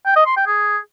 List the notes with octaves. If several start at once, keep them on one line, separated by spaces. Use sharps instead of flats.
G5
D#5
C6
G5
G#4